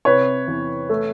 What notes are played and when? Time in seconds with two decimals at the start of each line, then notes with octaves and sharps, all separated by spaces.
0.05 C3 B4 C#5
0.48 E2
0.89 A3